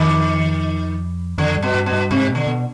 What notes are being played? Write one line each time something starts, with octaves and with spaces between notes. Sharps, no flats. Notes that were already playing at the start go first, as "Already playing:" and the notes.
Already playing: F2 D#3
F2 D3
G2
B2
G2
B2
G2
G#2 C3
B2
D3
B2